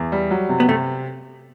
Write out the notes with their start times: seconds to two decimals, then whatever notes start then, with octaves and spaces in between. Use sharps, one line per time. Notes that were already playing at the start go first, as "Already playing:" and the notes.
Already playing: E2
0.12 G3
0.31 F#3
0.49 C3
0.60 B3
0.68 C3 A3